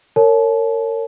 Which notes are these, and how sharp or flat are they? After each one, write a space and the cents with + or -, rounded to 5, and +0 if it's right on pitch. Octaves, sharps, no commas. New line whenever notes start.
A#4 -35 C#5 +0 A5 -40